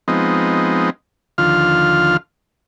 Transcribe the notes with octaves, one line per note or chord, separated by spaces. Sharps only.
F3 G#3 B3 C4 D#4
D#2 D3 F3 F4 F6